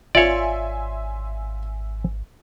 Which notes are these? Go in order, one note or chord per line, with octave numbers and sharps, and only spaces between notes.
G#1 F4 C#5 D5 E5 G#5 C6